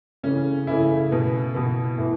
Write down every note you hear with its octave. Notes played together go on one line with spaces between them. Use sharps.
C#3 E3 A3 C#4
C#3 E3 A3 E4
B2 B3
B2 B3
A2 E3